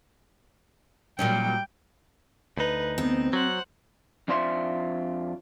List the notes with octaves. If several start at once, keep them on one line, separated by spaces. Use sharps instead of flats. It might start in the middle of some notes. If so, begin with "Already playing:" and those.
A#2 F#3 G3 C#4 G5
D2 D#4 B4
B3 C4
F#3 C5 F#5
F2 D4 F4 C5 E5 C6